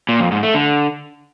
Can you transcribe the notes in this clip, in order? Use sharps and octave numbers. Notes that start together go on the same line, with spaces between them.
A#2
F2
G#2
A3
D3